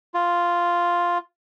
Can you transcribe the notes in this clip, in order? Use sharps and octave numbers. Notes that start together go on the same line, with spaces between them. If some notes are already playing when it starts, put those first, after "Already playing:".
F4